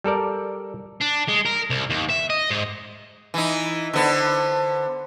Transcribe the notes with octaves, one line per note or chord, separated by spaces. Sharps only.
G3 A4 A#4 D5
D4
G#3
A#4
C2
D#2
E5
D#5
G#2
E3 D#4
D3 B3 C5